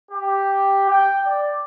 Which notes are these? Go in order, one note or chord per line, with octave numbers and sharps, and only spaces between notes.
G4
G5
D5